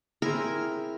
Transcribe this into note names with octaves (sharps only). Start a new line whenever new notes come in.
C4 E4 G#4 A#4